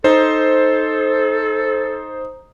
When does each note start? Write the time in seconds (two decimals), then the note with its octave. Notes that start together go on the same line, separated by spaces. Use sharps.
0.04 D#4 A4 C5